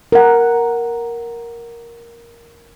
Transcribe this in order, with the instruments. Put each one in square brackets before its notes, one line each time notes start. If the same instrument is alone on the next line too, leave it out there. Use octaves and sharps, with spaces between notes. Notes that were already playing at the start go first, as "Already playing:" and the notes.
[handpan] A#4 F#5